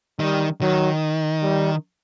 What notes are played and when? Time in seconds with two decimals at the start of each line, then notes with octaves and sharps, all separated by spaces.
0.20 D#3 G3
0.61 D#3 F#3
1.42 G3